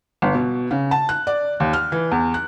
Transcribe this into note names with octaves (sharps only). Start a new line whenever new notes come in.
G1
B2
C#3
A5
F#6
D5
D#2
F6
E3
E2
F#6